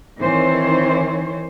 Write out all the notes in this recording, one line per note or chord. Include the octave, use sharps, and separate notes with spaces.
D#3 E3 C4 C5 C#5